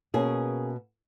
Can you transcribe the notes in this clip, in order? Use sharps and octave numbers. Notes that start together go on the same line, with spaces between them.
B2 A#3 C#4 G#4